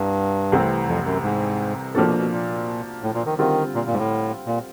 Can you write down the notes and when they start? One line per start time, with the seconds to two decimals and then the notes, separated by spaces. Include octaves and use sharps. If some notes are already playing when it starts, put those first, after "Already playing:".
Already playing: C2 G2
0.52 C2 C3 E3 A3 C4
0.87 F2
1.05 F#2
1.23 G#2
1.95 A2 F3 A#3 D4 F#4 A4
2.08 B2
2.18 B2
2.31 A#2
3.02 A2
3.14 A#2
3.26 D#3
3.39 D3 D#3 G3 C4 F4
3.75 A#2
3.87 A#2
3.93 G#2
3.99 A2
4.46 A#2